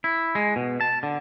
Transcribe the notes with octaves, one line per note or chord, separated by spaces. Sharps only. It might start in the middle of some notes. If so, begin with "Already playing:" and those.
E4
G#3
B2
A5
D3